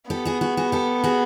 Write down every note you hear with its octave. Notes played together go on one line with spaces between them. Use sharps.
B3 G4 A4
F#4 G#4
F#4 G#4
F#4 G#4
G4 A4
F#4 G#4